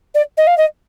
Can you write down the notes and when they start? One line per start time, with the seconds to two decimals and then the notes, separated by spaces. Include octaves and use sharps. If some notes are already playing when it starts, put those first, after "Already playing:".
0.14 D5
0.37 D#5
0.47 F5
0.57 D#5